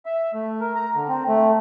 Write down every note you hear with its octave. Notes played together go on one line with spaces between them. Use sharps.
E5
A3
A#4
A#5
D3
C4
A3